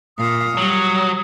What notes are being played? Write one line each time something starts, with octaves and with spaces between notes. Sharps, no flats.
A#2 F5 D#6
F#3 G3